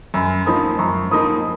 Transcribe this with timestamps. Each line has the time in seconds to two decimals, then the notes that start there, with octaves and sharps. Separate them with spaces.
0.14 F#2 G#5 B5
0.46 F3 A#3 D#4 B5 D#6
0.79 F#2 A#5 C#6
1.11 F3 A#3 D#4 B5 D#6